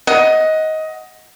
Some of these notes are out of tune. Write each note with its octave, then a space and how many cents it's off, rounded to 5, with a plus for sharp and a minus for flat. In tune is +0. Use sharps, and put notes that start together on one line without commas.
D#5 +15 F#5 +0